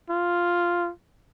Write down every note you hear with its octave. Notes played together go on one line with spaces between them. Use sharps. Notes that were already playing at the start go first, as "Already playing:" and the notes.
F4